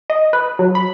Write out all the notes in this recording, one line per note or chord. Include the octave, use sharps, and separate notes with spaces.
D#5
B4
F#3
B5